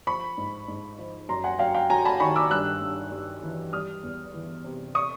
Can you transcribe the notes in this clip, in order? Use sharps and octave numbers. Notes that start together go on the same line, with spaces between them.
F3 B5 C#6
G#2
G#2
F3
F#2 A#5 C6
F#5 G#5
F#2 F5 G5
F5 G5
F#3 G#5 A#5
A5 B5
D#3 B5 C#6
D6 E6
G2 E6 F#6
G2
G3
E3
G3 D#6 F6
E2
E3
C3
C#6 D#6